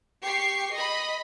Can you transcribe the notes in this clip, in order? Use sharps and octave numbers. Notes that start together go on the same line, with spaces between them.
G4 C#6 C7
D#5 B5